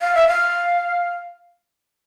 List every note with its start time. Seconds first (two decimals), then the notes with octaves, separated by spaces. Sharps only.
0.01 F5
0.15 E5
0.28 F5